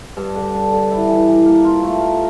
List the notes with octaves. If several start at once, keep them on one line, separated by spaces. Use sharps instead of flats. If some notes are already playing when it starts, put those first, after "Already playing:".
G2
D3
D4
D3
E4
E3
E3
A#3
F4
A3
A#4